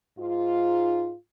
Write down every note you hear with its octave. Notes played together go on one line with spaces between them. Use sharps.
G#2 F4